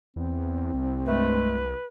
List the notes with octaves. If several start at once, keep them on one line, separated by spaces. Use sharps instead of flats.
E2 C4
C2
G2 G#3 A3 B4